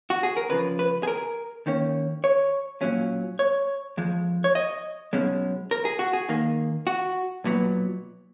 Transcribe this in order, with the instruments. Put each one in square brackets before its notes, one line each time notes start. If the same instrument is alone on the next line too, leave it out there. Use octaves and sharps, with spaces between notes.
[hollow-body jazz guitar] F#4
G#4
A#4
C#2 C#3 F3 B4
B4
G#4
A#4
D#2 D#3 A#3 C#4
C#5
B1 A#2 F#3 C#4
C#5
F2 F3 G#3
C#5
D#5
B1 B2 G#3 C#4
A#4
G#4
F#4
G#4
D#2 D#3 A#3
F#4
B1 A#2 F#3 B3